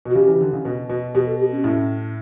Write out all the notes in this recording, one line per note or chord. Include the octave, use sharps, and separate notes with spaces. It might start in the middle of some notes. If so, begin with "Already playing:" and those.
B2
F#4
C#3 G4
E3
D3
C#3
B2
B2
B2 G4
A4
G4
C#4
A2